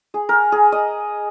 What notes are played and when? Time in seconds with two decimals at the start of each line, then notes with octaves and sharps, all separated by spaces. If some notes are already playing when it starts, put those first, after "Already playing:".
0.14 G#4
0.29 A#4
0.52 G#4
0.72 D#5